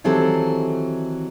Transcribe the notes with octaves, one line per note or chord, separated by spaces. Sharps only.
D#3 E3 F#3 C4 G4 A4